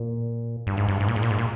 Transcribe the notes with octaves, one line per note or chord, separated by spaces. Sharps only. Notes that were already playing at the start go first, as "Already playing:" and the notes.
Already playing: A#2
G2
G#2
G2
G#2
A#2
G#2
A#2
G#2
A#2